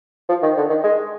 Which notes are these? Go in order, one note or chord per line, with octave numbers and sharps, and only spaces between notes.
F3
D#3
D3
D#3
G#3